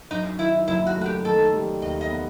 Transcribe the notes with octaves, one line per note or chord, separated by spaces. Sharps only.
F#2 D#4
D#3 E4
F#1 E4
F#4
A3
F#4
G4
D#3 A4
G3
D#2 D#5
D#5
B3